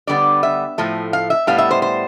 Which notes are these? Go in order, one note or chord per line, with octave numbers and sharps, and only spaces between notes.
D3 G3 B3 D5
E5
A2 F3 A3
F5
E5
A2 G3 B3 F5
E5
C5
C5